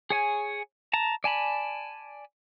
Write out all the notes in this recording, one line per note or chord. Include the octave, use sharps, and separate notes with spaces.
G#4 C#5 G#5
A5 A#5
D5 G#5 A5 B5